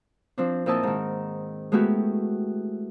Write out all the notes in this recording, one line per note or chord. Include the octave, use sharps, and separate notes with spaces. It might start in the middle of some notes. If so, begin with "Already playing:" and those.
F3 C4 D4
A#2 C4 E4 D#5 A5 E6
G#2 D#3
G#3 A3 B3 E4 F#4 G4